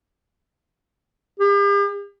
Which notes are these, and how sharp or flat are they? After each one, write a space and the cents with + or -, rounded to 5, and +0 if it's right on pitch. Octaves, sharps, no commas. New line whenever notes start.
G4 +45